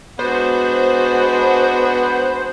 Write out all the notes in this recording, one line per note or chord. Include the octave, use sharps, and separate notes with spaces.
G#3 B3 D4 F#4 C5